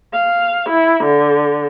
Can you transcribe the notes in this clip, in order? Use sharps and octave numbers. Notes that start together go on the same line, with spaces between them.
F5
E4
D3